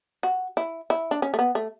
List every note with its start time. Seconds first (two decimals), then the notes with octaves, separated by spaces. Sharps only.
0.23 F#4
0.57 E4
0.90 E4
1.11 D4
1.22 C#4
1.34 A3
1.39 B3
1.55 A3